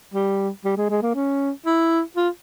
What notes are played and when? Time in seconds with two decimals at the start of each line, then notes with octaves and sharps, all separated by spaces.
0.14 G3
0.65 G3
0.77 G#3
0.90 G#3
1.03 A#3
1.15 C#4
1.66 E4
2.17 F4